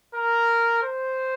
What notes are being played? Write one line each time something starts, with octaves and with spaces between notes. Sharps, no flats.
A#4
C5